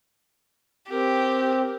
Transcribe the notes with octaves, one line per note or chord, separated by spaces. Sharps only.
C4 G4 A#4